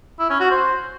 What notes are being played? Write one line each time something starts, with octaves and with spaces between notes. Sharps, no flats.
E4
C#4
F#4
C5